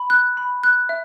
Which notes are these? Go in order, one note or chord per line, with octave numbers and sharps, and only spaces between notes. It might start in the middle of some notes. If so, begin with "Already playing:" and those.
Already playing: B5
F#6
B5
F#6
E5